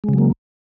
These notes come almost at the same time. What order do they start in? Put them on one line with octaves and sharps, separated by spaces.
G#3 C#3 F#3 A#3